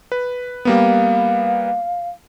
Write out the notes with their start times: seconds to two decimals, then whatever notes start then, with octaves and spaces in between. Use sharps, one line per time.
0.12 B4
0.65 G3 A#3 B3 F5